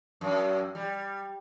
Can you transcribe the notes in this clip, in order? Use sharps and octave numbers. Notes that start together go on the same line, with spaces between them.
F#2
G3